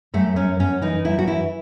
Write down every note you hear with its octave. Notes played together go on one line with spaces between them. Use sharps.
F#2 A3
F#2 C#4
F#2 C#4
E3 D#4
F#2 E4
F#4
E3 E4